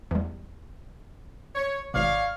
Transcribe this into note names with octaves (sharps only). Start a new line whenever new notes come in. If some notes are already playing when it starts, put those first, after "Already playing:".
E2 G3
C#5
G#1 B2 C#5 D5 F5